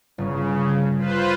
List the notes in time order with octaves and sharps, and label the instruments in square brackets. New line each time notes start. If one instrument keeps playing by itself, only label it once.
[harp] G1 C#4 [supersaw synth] C#3
[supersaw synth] F4 B4 C5